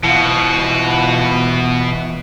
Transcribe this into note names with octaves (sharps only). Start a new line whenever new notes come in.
B2 E3 F4